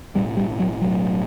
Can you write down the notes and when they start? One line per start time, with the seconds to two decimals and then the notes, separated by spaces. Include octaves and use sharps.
0.15 B1 A2 G3
0.37 G3
0.59 F#3
0.81 B1 A2 F#3